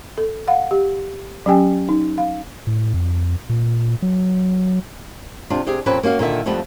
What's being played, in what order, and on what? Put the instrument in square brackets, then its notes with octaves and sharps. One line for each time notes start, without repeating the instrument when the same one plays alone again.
[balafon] A4
F5 F#5
G4
F#3 C#4 G4 G5 G#5
D#4
F5
[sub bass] A2
F2
A#2
F#3
[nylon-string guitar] C3 D4 F4
C3 G4 G#4
F2 A#2 C4 C#4 B4
A#3 C#4 F#4 F5
A#2 D3 D#3 E5
F2 F3 G3 A3 B3